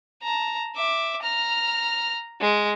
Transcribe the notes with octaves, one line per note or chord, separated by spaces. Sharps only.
A5 A#5
E5 D6
A#5 F6
G#3